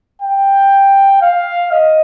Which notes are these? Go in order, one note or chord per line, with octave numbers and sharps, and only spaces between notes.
G5
F5
D#5